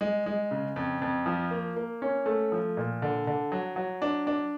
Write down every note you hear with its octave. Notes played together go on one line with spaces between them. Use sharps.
G#3
G#3
C#3
F2
F2
F3
A#3
A#3
C#4
A3
F3
A#2
D3
D3
F#3
F#3
D4
D4